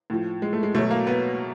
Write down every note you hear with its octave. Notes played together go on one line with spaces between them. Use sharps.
A2 F3
G#3
A3
G#3
B2 F#3 A3
A#3
B3